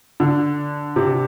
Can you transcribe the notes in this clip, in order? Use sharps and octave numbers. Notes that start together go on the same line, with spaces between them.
D3
C3